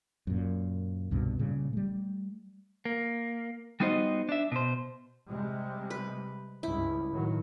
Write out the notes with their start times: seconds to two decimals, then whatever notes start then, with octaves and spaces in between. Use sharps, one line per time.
0.27 F#2 A#2
1.11 C2 G2 B2
1.38 A#2 C#3 G3
1.73 G3 A3
2.85 A#3
3.80 G3 B3 D#4 F#4 C5 D#5
4.29 D4 E5
4.52 B2 C5
5.28 C3 G3 G#3
5.90 B4
6.63 C#2 G2 C#3 E4
7.11 A2 D#3 F#3